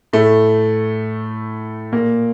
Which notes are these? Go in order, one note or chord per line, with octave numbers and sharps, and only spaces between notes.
A2 A3
A#2 A#3